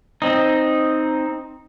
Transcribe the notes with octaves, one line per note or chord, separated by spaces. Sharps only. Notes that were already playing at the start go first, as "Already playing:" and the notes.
C4 D#4